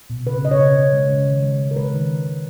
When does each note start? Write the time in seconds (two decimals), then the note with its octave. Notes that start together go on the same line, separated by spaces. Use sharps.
0.10 B2
0.26 C#3 B4
0.43 C#3 D#5
0.51 C#5
0.60 C#3
0.77 C#3
0.93 G#3
1.10 C#3
1.27 D#3
1.43 G#3
1.60 G#3
1.71 A#4
1.76 G#3 B4
1.93 D#3
2.09 G#3
2.26 C#3